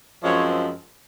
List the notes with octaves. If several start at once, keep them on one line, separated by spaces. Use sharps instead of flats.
F#2 F3 G#3 C4 C#5